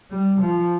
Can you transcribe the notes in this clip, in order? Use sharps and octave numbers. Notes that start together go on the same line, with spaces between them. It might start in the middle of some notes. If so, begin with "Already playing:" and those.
G3
F3